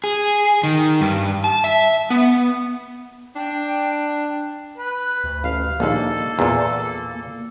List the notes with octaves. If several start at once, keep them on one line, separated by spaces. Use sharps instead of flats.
G#4
D#3
G2
A5
E5
B3
D4 G5
B4
D2
A1 F5
A#1 D#2 A#3 A4
E2 A#2